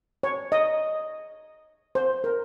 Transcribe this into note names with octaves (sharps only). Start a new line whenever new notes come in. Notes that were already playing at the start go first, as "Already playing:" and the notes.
C#5
D#5
C5
A#4